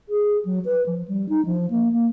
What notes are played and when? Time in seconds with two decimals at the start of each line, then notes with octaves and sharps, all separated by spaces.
0.09 G#4
0.45 F#3
0.65 B4
0.86 F3
1.08 G3
1.29 D#4
1.46 F3
1.70 A#3
1.93 A#3